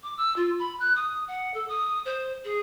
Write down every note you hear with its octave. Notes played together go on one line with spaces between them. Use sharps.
D6
E6
F4
B5
F#6
D#6
F#5
A4
D#6
C5
G#4